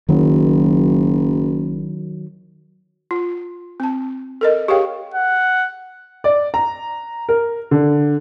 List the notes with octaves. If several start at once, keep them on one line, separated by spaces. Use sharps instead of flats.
F#1 D#3 F#3
F4
C4 A5
A4 A#4 D#5
G4 G#4 A#4 C#5 F5 G5
F#5
D5
A#5
A#4
D3